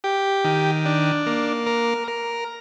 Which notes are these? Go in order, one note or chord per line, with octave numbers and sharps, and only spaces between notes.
G4
D#3
D4
A#3
A#4
A#4